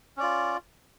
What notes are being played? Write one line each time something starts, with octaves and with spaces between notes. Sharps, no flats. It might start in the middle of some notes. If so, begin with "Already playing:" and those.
C#4 F4 D5